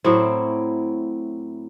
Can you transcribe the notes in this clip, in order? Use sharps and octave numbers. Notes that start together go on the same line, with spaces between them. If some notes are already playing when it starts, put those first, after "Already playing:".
A2 F#3 C4 E4